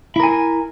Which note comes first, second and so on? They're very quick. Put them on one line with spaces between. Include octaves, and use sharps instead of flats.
E4 A#4 G#5